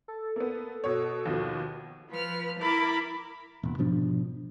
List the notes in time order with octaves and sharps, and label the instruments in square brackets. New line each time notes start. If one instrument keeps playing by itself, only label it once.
[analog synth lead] A4
[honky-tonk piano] A#3 B3
B2 C#5
D#2 B2 F3
[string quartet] F3 B4 F6
E4 A#4 B5 D6 A6
[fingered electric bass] E1 A#2
G#2 B2 F3 D4